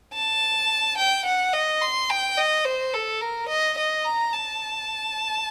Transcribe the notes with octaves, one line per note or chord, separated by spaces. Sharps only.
A5
G5
F#5
D#5
C6
G5
D#5
C5
A4
A#4
D#5
D#5
A#5
A5